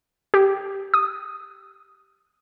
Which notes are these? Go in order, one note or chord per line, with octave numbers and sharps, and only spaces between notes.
G4
D#6